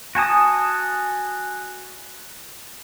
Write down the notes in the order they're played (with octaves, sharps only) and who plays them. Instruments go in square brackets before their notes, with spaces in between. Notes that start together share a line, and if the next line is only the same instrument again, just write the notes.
[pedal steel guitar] F#4 G#5 A5 D#6